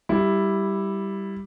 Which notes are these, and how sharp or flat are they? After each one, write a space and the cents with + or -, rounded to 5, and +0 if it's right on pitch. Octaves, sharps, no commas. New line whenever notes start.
G3 +0 E4 +0